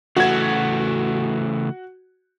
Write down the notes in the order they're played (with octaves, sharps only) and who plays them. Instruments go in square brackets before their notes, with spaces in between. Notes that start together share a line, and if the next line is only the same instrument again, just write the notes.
[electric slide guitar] C#3 E3 A3 [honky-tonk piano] F#4 G#6